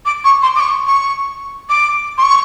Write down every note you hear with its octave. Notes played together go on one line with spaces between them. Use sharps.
D6
C#6
C6
D6
C#6
C#6
D6
C6
C#6